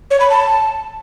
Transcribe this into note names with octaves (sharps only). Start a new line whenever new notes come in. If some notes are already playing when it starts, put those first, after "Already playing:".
C#5
B5
A5